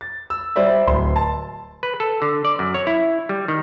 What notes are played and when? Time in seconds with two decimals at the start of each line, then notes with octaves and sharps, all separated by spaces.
0.01 A6
0.30 E6
0.56 G3 C5 D5 E5
0.87 D1 C6
1.16 A5
1.83 B4
2.00 A4
2.22 D3
2.45 D5
2.59 F#2
2.74 C#5
2.87 E4
3.29 G3
3.48 D#3